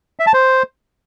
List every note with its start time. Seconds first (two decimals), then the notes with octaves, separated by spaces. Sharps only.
0.20 E5
0.27 A5
0.34 C5